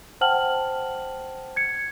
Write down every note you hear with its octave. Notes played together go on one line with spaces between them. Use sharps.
C5 F#5 G5 A5 F6 F#7
G#6 C#7